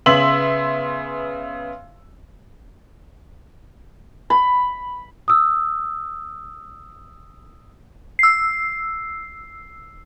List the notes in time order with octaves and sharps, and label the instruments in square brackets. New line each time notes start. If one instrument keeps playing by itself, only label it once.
[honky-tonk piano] C#3 B3 E5 C6 E6 F#7
[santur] B5
[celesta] D#6 E6
[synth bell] E6 C7